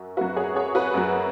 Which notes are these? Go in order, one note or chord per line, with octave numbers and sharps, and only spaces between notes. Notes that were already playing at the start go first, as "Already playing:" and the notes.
Already playing: F#2 F#4
F#2 F#3 F#4 B4
G#4 C#5
G#4 C#5
F#4 B4
F#2 F#3